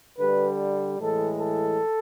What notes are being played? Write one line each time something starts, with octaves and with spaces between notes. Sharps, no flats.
D3 G3 B4
A2 E3 G#3 A4
A4